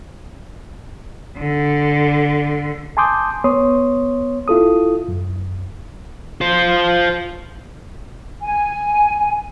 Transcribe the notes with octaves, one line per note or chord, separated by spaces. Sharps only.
D3
G#5 A5 C6 D6 D#6 G6
B3 C#5 C6 D#6
E4 F4 A4 D#6
F#2
F4 C5
G#5